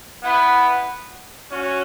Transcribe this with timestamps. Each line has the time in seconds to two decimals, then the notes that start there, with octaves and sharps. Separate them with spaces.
0.23 B3 E4 B4
1.52 C#4 F#4